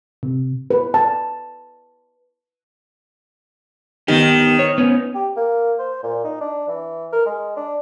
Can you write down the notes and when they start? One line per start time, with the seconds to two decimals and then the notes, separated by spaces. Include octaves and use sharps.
0.23 C3
0.70 B4
0.94 A5
4.08 D#3 B3 D#4 G4
4.59 C#5
4.78 B3 C#4
5.15 G4
5.36 A#3
5.79 C5
6.03 A#2
6.24 D#4
6.41 D4
6.68 E3
7.13 A#4
7.26 G#3
7.57 D4